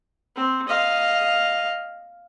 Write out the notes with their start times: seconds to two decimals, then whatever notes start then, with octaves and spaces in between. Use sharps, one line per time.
0.36 C4
0.69 D#5 F5